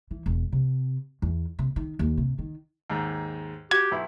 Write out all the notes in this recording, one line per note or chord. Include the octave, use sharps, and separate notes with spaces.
E3
E1
C3
E2
C3
D#3
D#2
C3
D#3
D#2 G#2
F#4 G4 G#6
B1 E4